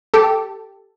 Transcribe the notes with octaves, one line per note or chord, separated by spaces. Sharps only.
G4 A4